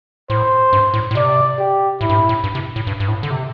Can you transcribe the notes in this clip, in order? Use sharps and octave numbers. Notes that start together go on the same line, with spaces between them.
A2 C5
G2
A2
A2
C3 D5
G4
A2 E4
G2
A2
A2
G2
C3
A2
G2
G2
A2
D3
C3